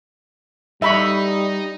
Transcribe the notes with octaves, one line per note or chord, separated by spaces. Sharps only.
G3 D#4 E5 B5 C#6